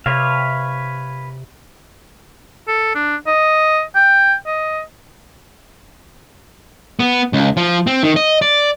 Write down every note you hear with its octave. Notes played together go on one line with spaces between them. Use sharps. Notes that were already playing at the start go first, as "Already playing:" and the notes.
C3 B4 C#5 F5
A4
D4
D#5
G5
D#5
B3
C#2
F3
C4
D#3
D#5
D5